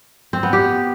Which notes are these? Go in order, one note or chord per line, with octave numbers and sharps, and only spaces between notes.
C4
B3
G4